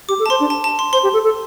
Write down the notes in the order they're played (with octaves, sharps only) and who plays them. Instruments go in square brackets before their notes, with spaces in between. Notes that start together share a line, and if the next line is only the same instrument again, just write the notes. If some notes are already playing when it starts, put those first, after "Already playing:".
[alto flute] G4 [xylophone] D6
[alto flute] A4
[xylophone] A5
[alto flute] C5 [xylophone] C6
[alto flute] D4
[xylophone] A5
A5
C6
[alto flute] C5 [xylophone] C6
[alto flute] G4
A4
A4